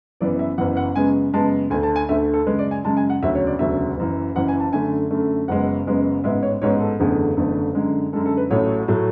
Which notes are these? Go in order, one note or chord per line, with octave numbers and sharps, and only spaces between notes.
F#1 F#2 E3 B3 D5
E5
F#1 F#2 E3 B3 F#5
F#5
F#2 C#3 G#3 B3 G#5
F#2 C#3 G#3 B3 A5
D2 D3 A3 G#5
A5
G#5
D2 D3 A3 E5
A4
F#2 C#3 G#3 B4
D5
G#5
F#2 C#3 G#3 A5
G#5
F#5
E1 D2 C#3 F#3 E5
C#5
D5
E1 D2 C#3 F#3 E5
F#1 F#2 E3
F#1 F#2 E3 F#5
G#5
A5
F#2 D3 A3 G#5
F#2 D3 A3
F#1 F#2 C#3 G#3 B3 F#5
F#1 F#2 C#3 G#3 B3
A1 G#2 G#3 B3 E5
C#5
A1 G#2 G#3 B3 C#5
A4
F#1 E2 D3 A3 G#4
F#1 E2 D3 A3
F#2 D3 G#3
F#2 D3 G#3 A4
A4
B4
A1 A2 F#3 A3 C#5
A2 F#3 A3